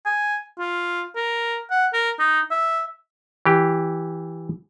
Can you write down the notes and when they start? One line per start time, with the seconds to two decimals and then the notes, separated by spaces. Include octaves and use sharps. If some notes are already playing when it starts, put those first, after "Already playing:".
0.06 G#5
0.59 F4
1.15 A#4
1.70 F#5
1.93 A#4
2.19 D#4
2.51 E5
3.46 E3 G4